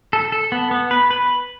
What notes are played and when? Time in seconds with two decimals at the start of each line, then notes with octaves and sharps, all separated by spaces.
0.13 A4
0.32 A4
0.52 B3
0.71 B3
0.91 B4
1.11 B4